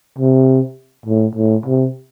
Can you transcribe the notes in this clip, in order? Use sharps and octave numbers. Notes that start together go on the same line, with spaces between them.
C3
A2
A2
C3